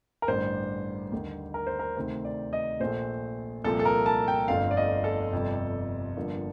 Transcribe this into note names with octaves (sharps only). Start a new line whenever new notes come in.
A#4
A1 G2 D3 G3 C5
D#2 D3 G3
A#4
C5
A#4
D2 C3 D#3 C5
D5
D#5
A#1 A#2 A3 C5
C2 A#2 F3 C4 A4
A4
A#4
A5
G5
G1 F2 D3 A3 C4 F5
D5
D#5
A4
G1 F2 C3 G3
G1 G2 D3 F3 A#3